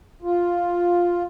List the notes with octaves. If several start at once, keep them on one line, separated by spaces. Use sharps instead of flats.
F4